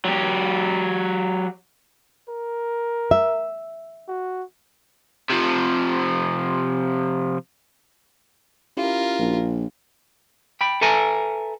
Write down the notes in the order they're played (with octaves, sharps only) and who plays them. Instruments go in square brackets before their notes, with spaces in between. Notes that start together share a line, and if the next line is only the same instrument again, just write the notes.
[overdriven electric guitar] F#3 G4
[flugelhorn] A#4
[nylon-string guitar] E5
[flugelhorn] F#4
[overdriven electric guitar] C3 F3
[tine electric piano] C#4 E4 G4 [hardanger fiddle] F4 A#4
[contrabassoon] A#1
[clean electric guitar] G5 B5
A4 B4 E5 G#5 A#5